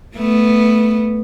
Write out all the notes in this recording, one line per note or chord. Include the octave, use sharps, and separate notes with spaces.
A3 B3